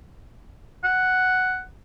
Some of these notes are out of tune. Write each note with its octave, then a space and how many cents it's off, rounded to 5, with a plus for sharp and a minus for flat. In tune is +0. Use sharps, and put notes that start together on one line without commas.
F#5 +5